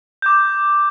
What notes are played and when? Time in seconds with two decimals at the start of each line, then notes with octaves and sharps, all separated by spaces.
0.22 D6 G6